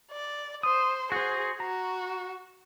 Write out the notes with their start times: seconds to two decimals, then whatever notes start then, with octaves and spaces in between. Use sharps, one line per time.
0.11 D5
0.63 C5 D#6
1.12 F#4 G#4 C5
1.60 F#4 A#5